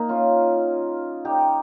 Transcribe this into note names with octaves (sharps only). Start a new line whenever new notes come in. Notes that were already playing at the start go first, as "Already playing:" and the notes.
Already playing: A#3 D#4
C#4 F4
D#4 G4